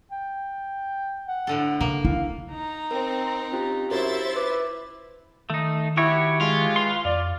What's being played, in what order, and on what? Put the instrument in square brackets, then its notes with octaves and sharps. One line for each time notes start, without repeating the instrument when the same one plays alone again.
[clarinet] G5
F#5
[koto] A2 D3 A4
[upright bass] C#3 [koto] A#3
[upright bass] E4 [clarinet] F5
[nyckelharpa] D#4 A#5
[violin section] C4 [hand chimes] A#4
[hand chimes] C#4 F4 G4
[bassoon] F#2 [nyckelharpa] E4 [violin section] C5 E5 A6
[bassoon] B4 [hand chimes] B5 D6
[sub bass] D#3 [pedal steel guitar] A3 D#4
[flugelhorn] E4 [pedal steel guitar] F#4 G4 C#5
[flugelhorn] G#3 [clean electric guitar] F4
[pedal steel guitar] B4 C6
[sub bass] F2 [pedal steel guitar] F4 [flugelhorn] D5